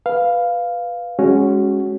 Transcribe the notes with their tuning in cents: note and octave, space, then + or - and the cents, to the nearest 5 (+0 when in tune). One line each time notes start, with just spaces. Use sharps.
B4 +0 F5 +0
G#3 +0 C#4 +0 F#4 +15